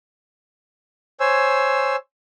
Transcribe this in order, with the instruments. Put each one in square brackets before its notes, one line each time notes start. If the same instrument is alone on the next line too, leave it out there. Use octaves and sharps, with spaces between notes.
[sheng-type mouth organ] C5 C#5 G#5 E6